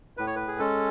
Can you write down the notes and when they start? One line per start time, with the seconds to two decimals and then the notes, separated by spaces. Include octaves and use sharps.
0.17 A2 B4
0.27 C#5
0.36 B4
0.48 G#4
0.59 G#3 C#4 A4